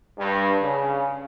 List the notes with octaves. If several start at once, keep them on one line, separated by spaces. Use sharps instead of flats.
G2
C#3